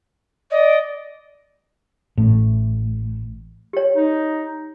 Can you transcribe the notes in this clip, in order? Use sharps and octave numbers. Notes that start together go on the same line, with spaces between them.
D5 D#5
A1 A2
G4 C#5
D#4